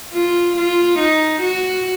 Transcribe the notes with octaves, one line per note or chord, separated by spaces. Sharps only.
F4
F4
D#4
F#4